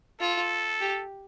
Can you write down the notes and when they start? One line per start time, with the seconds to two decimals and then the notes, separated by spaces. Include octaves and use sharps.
0.20 F4 A4
0.81 G4